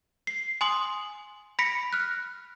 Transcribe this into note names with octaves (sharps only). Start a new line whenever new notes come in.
C7
G#5 C6 D#6 F#7
B5 A#6 B6 C#7 D7
F6 F#6